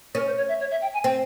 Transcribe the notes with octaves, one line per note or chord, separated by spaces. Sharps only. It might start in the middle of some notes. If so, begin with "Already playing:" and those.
C#4 A#4
C5
C#5
E5
C#5
E5
G5
G#5
C4 G5